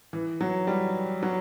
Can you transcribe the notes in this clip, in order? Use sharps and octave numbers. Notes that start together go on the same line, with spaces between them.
E3
F#3
G3
F#3